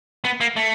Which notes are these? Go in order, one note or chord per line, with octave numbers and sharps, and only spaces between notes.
B3
A#3
A3